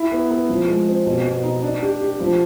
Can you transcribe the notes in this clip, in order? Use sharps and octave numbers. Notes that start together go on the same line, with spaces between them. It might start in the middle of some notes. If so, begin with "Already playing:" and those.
Already playing: E4
B3
B3
F3
G#3
C4
B2
B2
D#4
D4
G4
G4
F3